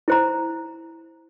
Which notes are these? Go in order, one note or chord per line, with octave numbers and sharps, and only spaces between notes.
E4 C5 A#5